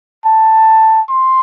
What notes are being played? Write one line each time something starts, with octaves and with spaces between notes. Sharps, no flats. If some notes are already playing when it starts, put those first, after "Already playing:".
A5
C6